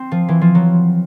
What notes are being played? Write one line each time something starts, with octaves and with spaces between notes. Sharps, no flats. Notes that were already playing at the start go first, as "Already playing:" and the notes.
Already playing: C4
F3
E3
F3
F#3